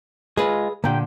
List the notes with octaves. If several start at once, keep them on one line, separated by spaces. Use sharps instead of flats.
G#3 F4 G#4 B4
A#2 D3 A#3 G4 G5